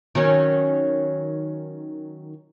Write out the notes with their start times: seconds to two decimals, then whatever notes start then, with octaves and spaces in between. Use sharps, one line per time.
0.15 D#3 F#3 C#4